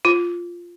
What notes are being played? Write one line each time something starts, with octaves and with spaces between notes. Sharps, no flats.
F4